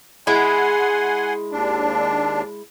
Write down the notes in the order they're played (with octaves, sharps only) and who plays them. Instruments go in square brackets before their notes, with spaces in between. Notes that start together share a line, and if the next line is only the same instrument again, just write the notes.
[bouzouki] G#3 E4 [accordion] F#5 G#5 C6
[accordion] D#2 D4